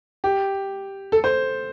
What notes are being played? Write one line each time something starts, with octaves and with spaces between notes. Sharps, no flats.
G4
A4
C5